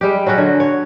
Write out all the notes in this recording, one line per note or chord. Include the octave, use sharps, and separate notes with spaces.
G3 G#3 G4
F#3 G#3 C#4 F#4
D3
C#5